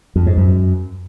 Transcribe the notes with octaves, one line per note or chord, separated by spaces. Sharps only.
F2
G#2
F#2